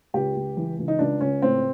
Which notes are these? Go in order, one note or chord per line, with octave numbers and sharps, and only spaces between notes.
C#2 G4
C#2
E3
C#2
D#4
C#2 D4
C#2 C#4
A2 C4